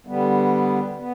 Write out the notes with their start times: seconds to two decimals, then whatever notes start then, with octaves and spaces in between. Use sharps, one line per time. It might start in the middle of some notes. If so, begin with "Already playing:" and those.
0.07 D3 G3 B3
0.98 B3